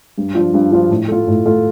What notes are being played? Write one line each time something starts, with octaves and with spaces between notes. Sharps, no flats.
G2
F3 D4 F4
G2
F3 D4 F4
A2
A3 F4
A2
A3 F4